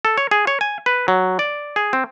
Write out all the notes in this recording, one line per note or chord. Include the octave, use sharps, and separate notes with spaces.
A4
C#5
G#4
C#5
G#5
B4
F#3
D5
G#4
C4